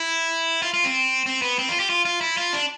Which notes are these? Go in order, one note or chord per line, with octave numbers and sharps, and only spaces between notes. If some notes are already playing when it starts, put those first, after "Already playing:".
Already playing: E4
F4
F4
C4
C4
B3
C4
F4
G4
F4
F4
E4
F4
D4